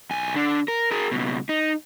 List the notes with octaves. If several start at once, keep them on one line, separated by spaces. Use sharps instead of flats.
B1 G#5
D3 D4
A#4
G#4 A#4
C#2 B2
D#4